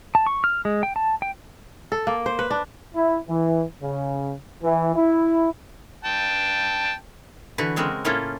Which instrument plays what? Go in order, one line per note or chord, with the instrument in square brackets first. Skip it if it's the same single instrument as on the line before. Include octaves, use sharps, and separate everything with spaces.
[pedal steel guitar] A5
C#6
F6
G#3
G5
A5
G5
[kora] A4
A#3
C5
B4
D4
[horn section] E4
E3
C#3
E3
E4
[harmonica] G5 A5
[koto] D3 E3 F#4 B4
C#3 G#3 C4 F#4 A#4
A2 A#3 C#4 E4 F4 A4